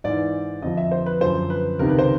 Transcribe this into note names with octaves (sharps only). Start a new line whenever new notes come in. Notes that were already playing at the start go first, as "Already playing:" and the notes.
G#2 E3 D5
F2 D3 F3 D#5
E5
C5
B4
F#2 D3 F3 C5
B4
C#2 C3 D#3 A#4
B4
C5